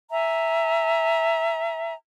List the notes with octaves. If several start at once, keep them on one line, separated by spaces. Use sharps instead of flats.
E5 G#5 A#5